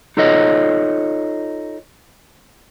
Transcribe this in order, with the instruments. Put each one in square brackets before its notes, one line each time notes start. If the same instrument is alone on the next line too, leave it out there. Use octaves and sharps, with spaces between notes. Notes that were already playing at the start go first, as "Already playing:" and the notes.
[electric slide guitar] D#4 F4 A4 C#5 D#5